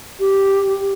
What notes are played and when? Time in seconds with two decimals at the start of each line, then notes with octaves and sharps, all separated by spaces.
0.20 G4